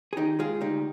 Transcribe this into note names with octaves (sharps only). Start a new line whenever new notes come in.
G#4
D#3 D#4 G4
G#3 F4 G#4
D2 D#4 G4